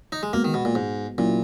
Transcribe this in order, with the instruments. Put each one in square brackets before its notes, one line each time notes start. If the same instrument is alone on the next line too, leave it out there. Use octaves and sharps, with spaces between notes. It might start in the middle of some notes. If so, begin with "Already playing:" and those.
[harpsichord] D#4
G#3
[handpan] G#3 B3 F#4 [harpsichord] A#3
[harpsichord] D#3
B2
A#2
G#2
[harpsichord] A#2 [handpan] F#3 C#4 E4